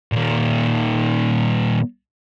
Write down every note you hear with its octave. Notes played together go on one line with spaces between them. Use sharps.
A#2 D#3